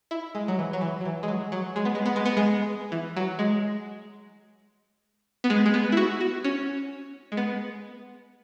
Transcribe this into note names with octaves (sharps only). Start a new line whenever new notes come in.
E4
G#3
F#3
E3
F#3
E3
F#3
E3
G#3
F#3
F#3
G#3
B3
G#3
B3
G#3
B3
G#3
E3
F#3
G#3
B3
G#3
G#3
B3
E4
F#4
F#4
C#4
G#3
B3